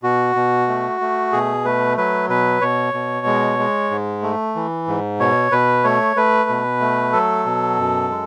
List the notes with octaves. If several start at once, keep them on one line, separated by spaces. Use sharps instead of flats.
B2 F#4
B2
A3
A3
B2 G#4
A3 B4
F#3 B4
B2 B4
B2 C#5
B2
G#3
G#3
G#2
A3
E3
G#2
B2 C#5
B2 B4
A3 C#5
A3 B4
B2
A3
F#3 A4
B2
F#2
G#3